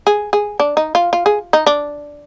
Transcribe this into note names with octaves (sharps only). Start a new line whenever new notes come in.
G#4
G#4
D4
D#4
F4
F4
G#4
D#4
D4